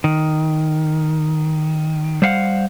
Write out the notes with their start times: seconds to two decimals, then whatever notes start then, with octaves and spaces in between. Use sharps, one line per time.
0.04 D#3
2.22 G3 C5 F5 F#5